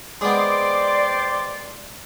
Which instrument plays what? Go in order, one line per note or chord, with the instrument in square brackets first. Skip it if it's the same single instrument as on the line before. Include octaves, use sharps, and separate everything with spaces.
[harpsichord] G#3 B3 [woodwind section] C5 G5 C6 [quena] D5 [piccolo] D6